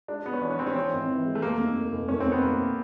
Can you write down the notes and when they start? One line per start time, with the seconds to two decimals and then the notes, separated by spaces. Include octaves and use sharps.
0.08 G#3 D4
0.25 G#3 B3
0.33 C#4
0.41 E3 D4
0.50 C#4
0.59 E3 C4
0.67 C#4
0.75 E3 C4
0.93 G#1
1.08 E3
1.26 G#3
1.35 A3
1.42 F1 A#3
1.60 D#2
1.76 F1
1.93 F1
2.08 D#2 C#4
2.20 C4
2.26 D#2
2.32 B3
2.43 F1 A#3